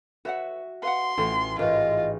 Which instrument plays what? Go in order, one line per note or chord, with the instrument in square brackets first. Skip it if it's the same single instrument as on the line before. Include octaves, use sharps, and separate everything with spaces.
[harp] F#4 E5 [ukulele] B4 C#5 F#5
[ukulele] B4 F5 F#5 [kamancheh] C6
[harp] A1 [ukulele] F4 A4 F#5
[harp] A1 G#2 [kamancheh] F4 [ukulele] A#4 B4 [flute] D#5